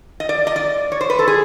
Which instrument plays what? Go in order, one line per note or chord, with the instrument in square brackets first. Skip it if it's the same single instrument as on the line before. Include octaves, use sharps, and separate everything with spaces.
[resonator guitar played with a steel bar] D#5
D5
D#5
D5
C#5
C5
B4
A4
G#4